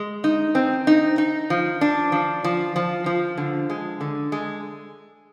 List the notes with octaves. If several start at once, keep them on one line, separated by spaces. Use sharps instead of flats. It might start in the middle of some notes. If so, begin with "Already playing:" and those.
Already playing: G#3
D#4
C4
D#4
D#4
F3
D4
F3
F3
F3
F3
D3
G#3
D3
G#3